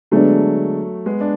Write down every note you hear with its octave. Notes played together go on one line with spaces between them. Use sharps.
D3 F#3 G#3 A3 B3 D4
G#3 B3
D4